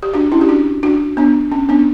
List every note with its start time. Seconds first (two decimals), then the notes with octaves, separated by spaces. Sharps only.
0.03 G4
0.14 D4 F#4
0.32 C#4 E4
0.41 G4
0.48 D4 F#4
0.83 D4 F#4
1.17 B3 D4
1.52 C#4
1.69 B3 D4